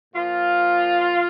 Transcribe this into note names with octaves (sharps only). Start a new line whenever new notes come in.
A#2 F3 F4